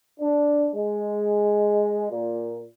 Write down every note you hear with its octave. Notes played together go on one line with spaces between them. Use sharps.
D4
G#3
A#2